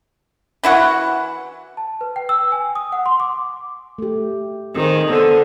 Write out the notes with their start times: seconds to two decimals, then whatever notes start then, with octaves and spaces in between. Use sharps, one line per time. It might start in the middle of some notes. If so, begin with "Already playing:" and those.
0.63 E3 E4 F#4 F#5
1.77 A5
2.01 B4
2.16 G5
2.29 E6
2.52 G#5
2.75 D#6
2.92 F#5
3.06 C6
3.20 D6
3.98 A3 G4
4.76 D#3 C4 G#4 C5
5.10 D3 B3 C5